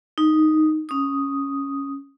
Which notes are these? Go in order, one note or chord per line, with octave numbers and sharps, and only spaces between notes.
D#4
C#4 D#6